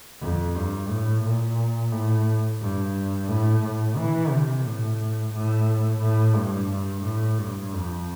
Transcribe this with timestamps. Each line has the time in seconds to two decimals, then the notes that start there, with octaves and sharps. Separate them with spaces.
0.21 F2
0.56 G2
0.89 A2
1.24 A#2
1.92 A2
2.61 G2
3.28 A2
3.63 A2
3.97 E3
4.31 C3
4.66 A2
5.33 A2
6.02 A2
6.36 G2
6.70 G2
7.04 A2
7.39 G2
7.73 F2